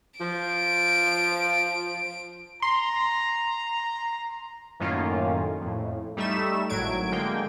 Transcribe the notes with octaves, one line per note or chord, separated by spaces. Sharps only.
F3 D7
A#5 C6
F#2 A2 D#3 A#3 C#4 F4
F2 A2
G3 A3 D#4 E5 E7
G#1 A2 F#3 G#6 D7
D3 G#3 A#3 G5